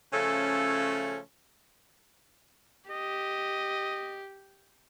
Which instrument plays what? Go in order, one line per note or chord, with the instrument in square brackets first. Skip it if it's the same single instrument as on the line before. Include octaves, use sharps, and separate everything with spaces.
[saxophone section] C#3 F3 A3 C#4 A4
[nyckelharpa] G4 [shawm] D#5